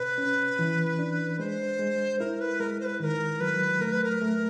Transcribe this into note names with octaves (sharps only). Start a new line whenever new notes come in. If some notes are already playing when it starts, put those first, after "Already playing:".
Already playing: C3 B4
C#4
E3
D4
G#3 C5
G#3
E4 A#4
B4
G#3 A#4
C5
B4
D#3 A#4 B4
F#3 B4
A3 A#4
B4
A#4
A3